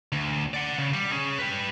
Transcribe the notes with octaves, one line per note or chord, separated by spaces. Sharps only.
D2
D5 F#5
C#3
G3
C#4 G#4
G4 B4